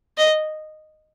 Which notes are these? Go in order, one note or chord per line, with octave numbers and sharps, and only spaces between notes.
D#5